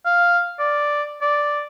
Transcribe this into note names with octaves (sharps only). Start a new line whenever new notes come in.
F5
D5
D5